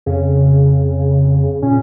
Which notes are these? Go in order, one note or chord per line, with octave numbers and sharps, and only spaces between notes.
F2 C#3
A#2 C#4